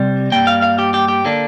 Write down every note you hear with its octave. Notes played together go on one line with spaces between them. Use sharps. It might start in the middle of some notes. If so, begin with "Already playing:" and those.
Already playing: C2 C3 G3
G2 G3 A#3 G5
F5
F5
G4
G4
G4
D3 A#3 D4